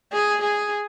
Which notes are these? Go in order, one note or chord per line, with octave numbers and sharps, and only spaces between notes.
G#4
G#4